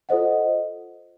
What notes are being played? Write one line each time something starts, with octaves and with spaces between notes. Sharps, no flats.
F4 A4 C5 D#5 F#5